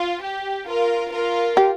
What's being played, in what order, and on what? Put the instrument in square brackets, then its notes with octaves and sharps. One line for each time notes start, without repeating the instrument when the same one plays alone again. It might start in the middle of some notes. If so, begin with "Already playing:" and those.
Already playing: [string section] F4
G4
F4 A#4
F4 A#4
[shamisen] G4